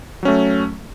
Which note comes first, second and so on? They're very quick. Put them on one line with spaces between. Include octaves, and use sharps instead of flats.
F#3 C#4 A3